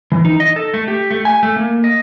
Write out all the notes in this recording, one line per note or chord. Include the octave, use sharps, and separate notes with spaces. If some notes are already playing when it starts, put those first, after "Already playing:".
E3
D#4
D#5
A4
A3
G4
A3
G#5
A3
A#3
D#5